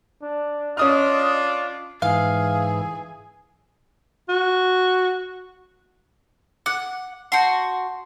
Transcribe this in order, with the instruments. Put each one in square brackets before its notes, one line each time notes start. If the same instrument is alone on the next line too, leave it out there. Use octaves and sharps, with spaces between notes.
[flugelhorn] D4
[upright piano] C#4 D#6 F6 [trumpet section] D4 F4 [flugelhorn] D#5
[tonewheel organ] G#2 E3 [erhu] G#4 [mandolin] F5
[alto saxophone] F#4
[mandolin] F#5 [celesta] D6 F#6
[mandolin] F#4 C6 [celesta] F#5 A5 G6